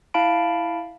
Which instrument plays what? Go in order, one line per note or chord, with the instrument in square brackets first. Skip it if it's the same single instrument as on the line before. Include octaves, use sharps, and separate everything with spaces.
[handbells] E4 F5 A5 B5 D7